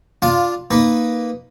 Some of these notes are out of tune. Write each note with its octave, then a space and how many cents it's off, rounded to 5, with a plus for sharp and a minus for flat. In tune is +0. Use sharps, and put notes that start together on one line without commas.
D4 +0 F4 +0 F5 +15
A#3 +0 D#4 +0 B4 +0